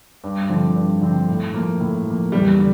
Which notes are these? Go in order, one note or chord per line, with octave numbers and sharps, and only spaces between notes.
G2
D3 F3 C4
G2
D3 F3 C4
A2
F3 A#3
A2
F3 A#3
E2 G3
D3